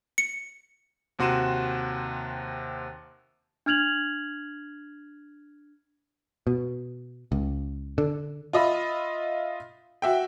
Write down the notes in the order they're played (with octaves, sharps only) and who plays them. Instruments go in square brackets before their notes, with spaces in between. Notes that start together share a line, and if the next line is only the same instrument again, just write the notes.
[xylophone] C#7
[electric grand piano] D#2 C3 F#4 C6 D#7 E7
[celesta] D4 F6 G#6 F7 F#7
[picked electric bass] B2
C#2
D3
[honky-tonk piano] F4 D#5 E5 B5
F#4 E5 G5